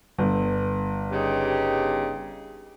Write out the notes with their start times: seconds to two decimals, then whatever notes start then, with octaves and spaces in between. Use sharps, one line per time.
0.18 G1
1.12 C#3 D#4 G4